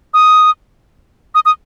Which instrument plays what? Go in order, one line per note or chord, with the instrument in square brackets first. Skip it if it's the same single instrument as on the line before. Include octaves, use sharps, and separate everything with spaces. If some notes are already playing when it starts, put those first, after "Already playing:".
[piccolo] D#6
D#6
D#6